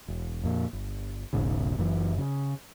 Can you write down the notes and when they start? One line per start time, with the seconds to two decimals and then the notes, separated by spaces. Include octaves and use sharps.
0.08 E1
0.44 F2 A#2
0.73 G1
1.33 E1 B1 G#2 C#3
1.78 F#1 F#2 A#2 E3
2.18 C#3